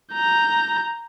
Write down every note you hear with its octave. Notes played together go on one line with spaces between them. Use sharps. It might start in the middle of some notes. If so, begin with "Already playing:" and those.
A#5 G6